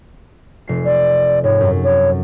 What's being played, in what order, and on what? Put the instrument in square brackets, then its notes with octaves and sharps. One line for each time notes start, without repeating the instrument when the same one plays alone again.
[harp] F1 C7
[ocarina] D5
[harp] G#2 [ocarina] C#5
[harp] F#2
[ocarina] C#5